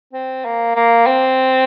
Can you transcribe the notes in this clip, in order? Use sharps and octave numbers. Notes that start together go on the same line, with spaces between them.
C4
A#3
A#3
C4